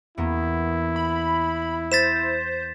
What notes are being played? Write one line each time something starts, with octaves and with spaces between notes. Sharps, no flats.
E2 A#3 B3 E4
B5
C5 A6 B6 E7